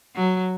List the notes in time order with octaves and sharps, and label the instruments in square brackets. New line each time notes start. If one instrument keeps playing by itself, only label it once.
[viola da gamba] F#3